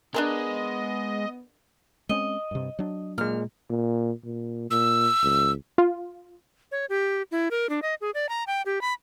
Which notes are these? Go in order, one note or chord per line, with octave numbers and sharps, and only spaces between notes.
G#3 B3 D4 G#4 A#4 D#5
G#3 C4 C#4 D#5
G2 C3
F#3 D4
A#2 G#3 F6
A#2
A#2
A#2 E6
C#2
F4
C#5
G4
E4
A#4
D4
D#5
G#4
D5
A#5
G5
G4
B5